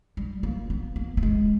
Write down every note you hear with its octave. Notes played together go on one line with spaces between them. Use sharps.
G3
A#3
B3
A#3
A3
G#3